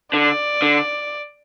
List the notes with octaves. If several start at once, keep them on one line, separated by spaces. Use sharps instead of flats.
D3 D5
D3